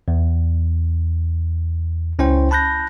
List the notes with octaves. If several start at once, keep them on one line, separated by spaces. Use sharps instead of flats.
E2
C#2 C#4 E4 C5 G5
A5 B5 F#6 G6 A#6